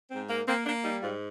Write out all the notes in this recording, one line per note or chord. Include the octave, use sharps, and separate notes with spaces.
G#2 C4
A#3
A#3 C4
A#3 D4
G3 D#4
G#2 F4